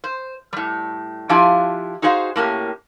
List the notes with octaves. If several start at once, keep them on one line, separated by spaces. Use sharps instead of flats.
C5
A2 G3
F3 D4 E4 F4 G4 G#5
D#4 F#4 G#4 C5 F5
A2 A#3 C#4 G4